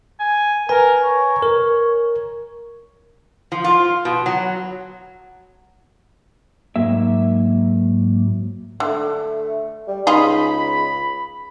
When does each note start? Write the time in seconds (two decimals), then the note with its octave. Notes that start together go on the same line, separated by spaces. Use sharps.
0.19 G#5
0.69 A#4 B4 G#5
1.02 C#5
1.42 A#4
3.52 F3
3.64 F4
4.05 B2
4.26 F#3
6.76 G#2 F#3 A#3 E5
8.80 D3 A3
9.88 G3
10.07 C#2 D#4 F4 G#4 B5